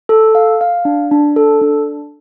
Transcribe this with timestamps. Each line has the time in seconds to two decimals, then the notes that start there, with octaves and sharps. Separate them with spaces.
0.09 A4
0.35 F5
0.61 F5
0.85 D4
1.11 D4
1.36 A4
1.61 D4